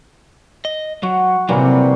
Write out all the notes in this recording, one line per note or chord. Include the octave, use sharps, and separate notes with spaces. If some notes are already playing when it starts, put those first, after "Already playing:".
D#5
F#3 F#4
C3 E3 F#3 G3 A#3